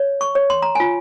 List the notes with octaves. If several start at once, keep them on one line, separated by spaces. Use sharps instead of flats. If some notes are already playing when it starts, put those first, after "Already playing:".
Already playing: C#5
C#6
C#5
C6
A#5
F4 G#5